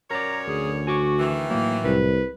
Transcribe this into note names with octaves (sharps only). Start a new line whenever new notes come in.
F#2 A#4 C#5 D5 A#5
D2 G#4
F#4 G#5 C#6 D6
D#3 E3
A2 F#3 A#3
C2 B4